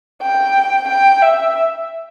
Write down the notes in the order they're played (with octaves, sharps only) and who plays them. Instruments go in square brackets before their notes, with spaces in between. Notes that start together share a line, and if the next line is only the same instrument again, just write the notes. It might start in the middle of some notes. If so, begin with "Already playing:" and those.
[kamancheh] G5
G5
E5